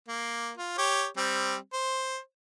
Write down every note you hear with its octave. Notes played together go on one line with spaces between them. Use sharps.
A#3
F4
G4 C#5
G3 C4
C5